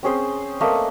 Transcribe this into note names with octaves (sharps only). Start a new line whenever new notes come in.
C4 C#4 G#4 C5
A3 A#3 B4 D#5